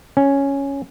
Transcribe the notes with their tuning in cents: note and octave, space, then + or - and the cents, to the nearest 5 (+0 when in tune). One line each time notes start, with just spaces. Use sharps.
C#4 +0